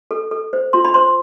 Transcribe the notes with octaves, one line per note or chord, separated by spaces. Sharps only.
A4
A4
C5
F4 C6
B5
C5 C6